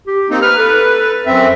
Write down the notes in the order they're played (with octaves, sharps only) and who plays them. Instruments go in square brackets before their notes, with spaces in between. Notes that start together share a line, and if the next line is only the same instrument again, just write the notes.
[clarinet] G4
[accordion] A#3 C4 D#4
[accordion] B4 [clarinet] F6
[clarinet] A4
[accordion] F#2 C4 [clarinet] E5